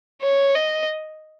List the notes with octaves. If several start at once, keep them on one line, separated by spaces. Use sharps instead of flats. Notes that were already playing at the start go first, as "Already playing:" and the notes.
C#5
D#5